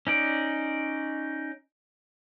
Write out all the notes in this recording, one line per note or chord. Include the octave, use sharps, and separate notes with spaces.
C#4 D#4 D5